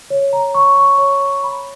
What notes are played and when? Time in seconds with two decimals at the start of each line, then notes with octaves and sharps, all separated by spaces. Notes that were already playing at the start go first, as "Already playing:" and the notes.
0.10 C#5
0.33 A#5
0.54 C#6
0.76 C#6
0.98 C#5
1.20 C#5
1.43 B5